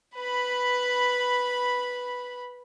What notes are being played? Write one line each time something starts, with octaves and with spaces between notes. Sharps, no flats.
B4 B5